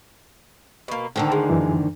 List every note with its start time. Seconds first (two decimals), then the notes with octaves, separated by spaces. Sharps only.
0.88 B2 A#3
1.16 D2 D3 D#3 A4 G5
1.32 G#3
1.50 F#2 E3